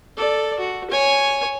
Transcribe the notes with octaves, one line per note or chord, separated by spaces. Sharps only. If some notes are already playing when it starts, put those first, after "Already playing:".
A4 D5
F#4
C#5 G#5